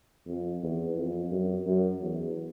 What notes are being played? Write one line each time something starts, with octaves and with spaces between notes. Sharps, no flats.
F2
E2
F2
F#2
F#2
E2